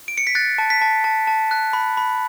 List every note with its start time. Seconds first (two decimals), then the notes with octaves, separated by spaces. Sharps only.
0.08 D7
0.18 C#7
0.27 B6
0.35 F#6 A6
0.58 A5
0.70 B6
0.81 A5
1.04 A5
1.27 A5
1.51 F#6
1.73 B5
1.97 B5